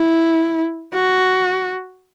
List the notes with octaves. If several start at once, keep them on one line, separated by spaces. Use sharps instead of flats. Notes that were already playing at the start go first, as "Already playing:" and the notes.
Already playing: E4
F#4